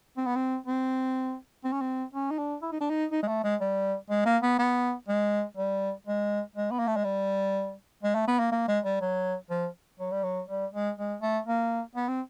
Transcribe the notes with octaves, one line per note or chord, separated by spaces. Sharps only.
C4
B3
C4
C4
C4
C#4
C4
C#4
D#4
D4
E4
D#4
D4
D#4
D#4
G#3
A3
G#3
G3
G#3
A#3
B3
B3
G#3
G3
G#3
G#3
B3
A#3
A3
G#3
G3
G#3
A3
B3
A#3
A#3
G#3
G3
F#3
F3
F#3
G3
F#3
G3
G#3
G#3
A3
A#3
B3
C4